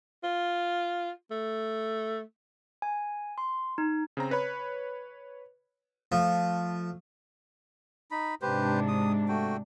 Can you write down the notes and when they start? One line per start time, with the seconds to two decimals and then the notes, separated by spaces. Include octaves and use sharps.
0.24 F4
1.31 A3
2.82 G#5
3.38 C6
3.78 D#4
4.17 C#3 C4 A#5
4.31 B4 C#5 B5
6.12 F3 A3
8.11 D#4 B5
8.42 G#2 C3 D4 G4 B4 C5
8.88 D#6
9.29 A3 F#4 G5